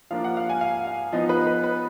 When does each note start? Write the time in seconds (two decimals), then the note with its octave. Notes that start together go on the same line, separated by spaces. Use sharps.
0.11 F3 A#3 D4 F5
0.24 F#5
0.37 F5
0.49 G#5
0.61 F5
0.87 F5
1.12 F3 B3 D#4 D#5
1.29 B4
1.47 B4
1.64 B4